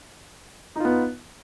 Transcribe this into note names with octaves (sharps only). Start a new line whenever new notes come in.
B3 D#4 F4